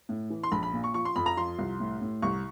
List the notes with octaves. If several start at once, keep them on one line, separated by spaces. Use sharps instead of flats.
A2
E3
C6
A#1 B5
B5
A#2
C#6
F3 C#6
C6
F2 B5
A#5
F3 C6
C2
A2
A2
C2 C#6